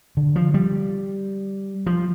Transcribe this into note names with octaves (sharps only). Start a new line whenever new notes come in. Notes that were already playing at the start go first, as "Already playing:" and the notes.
D3
F3
G3
F3